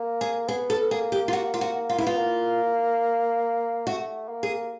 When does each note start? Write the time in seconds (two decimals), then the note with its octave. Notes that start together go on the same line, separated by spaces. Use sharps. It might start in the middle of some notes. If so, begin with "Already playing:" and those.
Already playing: A#3
0.21 G#4
0.48 B3 G#4
0.70 A4
0.91 A#3 G#4
1.12 G4
1.28 F4
1.33 F#4
1.54 F4
1.61 F#4
1.89 F4
1.98 E4
2.04 B3 F4
2.17 A#3
3.87 A3 F#4
4.28 A#3
4.43 G#4